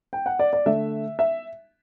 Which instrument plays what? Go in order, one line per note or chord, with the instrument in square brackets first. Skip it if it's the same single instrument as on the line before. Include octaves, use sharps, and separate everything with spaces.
[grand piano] G5
F#5
D5
D5
D3 A3 E5
E5